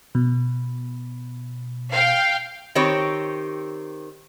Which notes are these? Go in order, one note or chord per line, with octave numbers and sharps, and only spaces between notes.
B2
F5 G5
D#3 C4 G4 C#5